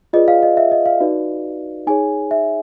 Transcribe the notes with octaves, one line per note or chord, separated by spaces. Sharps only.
F4 G#4 B4 D5 D#5
F5
D#5
E5
D#5
F5
D#4 F#4 B4 D5
D#4 G#4 C#5 G#5
E5